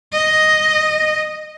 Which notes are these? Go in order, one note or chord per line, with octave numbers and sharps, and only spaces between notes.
D#5